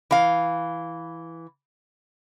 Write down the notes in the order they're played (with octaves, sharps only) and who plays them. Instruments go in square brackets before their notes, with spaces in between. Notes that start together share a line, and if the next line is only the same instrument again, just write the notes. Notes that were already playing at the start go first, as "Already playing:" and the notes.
[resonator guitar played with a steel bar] E3 F5